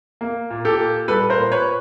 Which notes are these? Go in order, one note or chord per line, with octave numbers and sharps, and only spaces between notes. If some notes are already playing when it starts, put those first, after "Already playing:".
A#3
A#2
G4 A4
A#2
G3 A4 B4
A#4 C5
A#2
B4 C#5